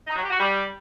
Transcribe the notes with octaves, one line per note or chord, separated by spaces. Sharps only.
D#4
F#3
G4
F#4
G3